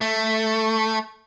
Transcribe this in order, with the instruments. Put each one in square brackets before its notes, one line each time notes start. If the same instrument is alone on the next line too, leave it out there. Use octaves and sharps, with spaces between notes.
[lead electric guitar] A3